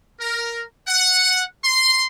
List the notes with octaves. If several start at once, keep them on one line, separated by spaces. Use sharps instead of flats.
A#4
F#5
C6